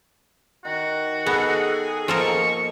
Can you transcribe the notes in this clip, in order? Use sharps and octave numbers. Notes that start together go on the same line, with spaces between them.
D#3 F#4
B3 D#4 G#4 A4
B2 F3 A#3 A4 A#4 D#5 C#6